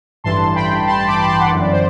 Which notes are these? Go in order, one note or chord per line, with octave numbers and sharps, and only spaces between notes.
A1 G2 E3 A5 C6
G5 B5
A5 C6
A5 C6
B5 D6
A5 C6
A5 C6
F#5 A5
G1 F#2 E3
D5
C5